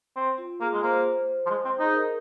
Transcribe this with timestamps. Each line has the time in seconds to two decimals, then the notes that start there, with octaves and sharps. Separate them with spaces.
0.16 C4
0.38 F4
0.61 A#3 G#4
0.73 G#3
0.83 A#3 C5
1.46 F3
1.50 G#3
1.65 C4
1.79 D#4 G#4
1.94 A#4